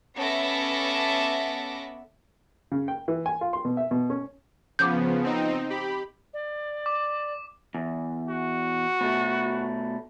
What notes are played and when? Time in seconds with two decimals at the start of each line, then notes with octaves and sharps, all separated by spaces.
0.17 B3 C#4 A4 E5 D6 A#6
2.72 C#3
2.88 G5
3.08 E3
3.26 G#5
3.41 F4
3.53 C6
3.65 B2
3.77 E5
3.91 B2
4.10 C#4
4.79 C#3 F3 B3 D6 G6
5.24 C4 D#4
5.70 G4 B5
6.34 D5
6.86 D6
7.75 E2
8.29 F#4
9.01 B2 A3